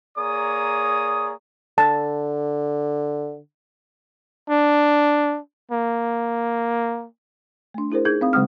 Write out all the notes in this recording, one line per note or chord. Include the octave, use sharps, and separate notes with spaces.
A#3 G#4 C#5 D5 A#5 D#6
D3 A5
D4
A#3
A3 D4
D4 E4 G#4 A#4 C5
D#4 G#4 G6 G#6
C4 F5 D#6
C#3 F#3 G#3 C4 D#6 F6